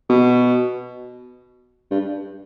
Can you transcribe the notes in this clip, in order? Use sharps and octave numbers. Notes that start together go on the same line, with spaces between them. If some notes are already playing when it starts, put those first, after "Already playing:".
B2
G2